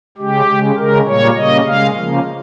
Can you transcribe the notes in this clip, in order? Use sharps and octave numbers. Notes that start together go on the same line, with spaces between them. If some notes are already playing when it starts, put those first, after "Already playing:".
C#3 G#3 G4
C#3 G#3
C#3 G#3 A#4
A#2 G3 A#3 C#5
C#3 G3 A#3 D#5
C#3 G#3 F5
C#3 F3 A#3